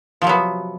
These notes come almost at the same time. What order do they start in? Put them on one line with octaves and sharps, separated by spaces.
F3 C3 F#3 B3